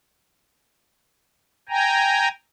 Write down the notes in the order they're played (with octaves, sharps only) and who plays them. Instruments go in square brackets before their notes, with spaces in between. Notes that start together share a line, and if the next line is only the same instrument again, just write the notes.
[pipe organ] G5 G#5 A#5